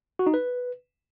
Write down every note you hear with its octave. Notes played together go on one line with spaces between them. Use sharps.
F#4
D#4
B4